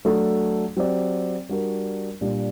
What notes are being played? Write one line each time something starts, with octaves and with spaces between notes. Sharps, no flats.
F#3 A3 D4 A4
F#3 C4 G4 D5
G3 D4 F#4 A#4
A#2 G3 D4